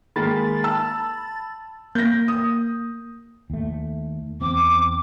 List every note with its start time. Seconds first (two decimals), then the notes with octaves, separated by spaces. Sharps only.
0.16 D#3 G#3 A#3 B5 A6
0.64 A5 E6
1.95 A#3 G6 A#6
2.28 D#6
3.50 D#2 A3
4.41 E2 C4 D6